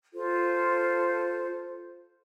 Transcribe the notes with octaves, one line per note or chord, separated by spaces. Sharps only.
F4 A4 C5